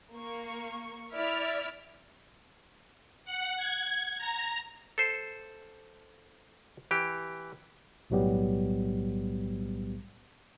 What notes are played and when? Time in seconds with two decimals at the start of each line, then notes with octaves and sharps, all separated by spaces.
0.15 A#3 C#6
1.13 E4 D5 E5 F6 B6
3.25 F#5
3.57 G#6
4.18 A#5
4.98 A4 C5
6.91 E3 G4
8.10 B1 A2 F#3 G3 B3 G4